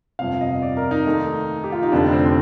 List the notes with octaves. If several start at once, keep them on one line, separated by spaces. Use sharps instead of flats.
G1 F2 C3 F5
D#5
D5
A#4
D#4
D#2 D#3 A3
G4
F4
D#4
F1 F2 D3 A3 D4
C4